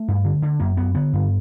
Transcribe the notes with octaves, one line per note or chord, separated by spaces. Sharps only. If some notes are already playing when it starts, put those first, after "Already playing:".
Already playing: A3
G2
D3
D3
F#2 A#3
F#2 B3
D3 B3
G2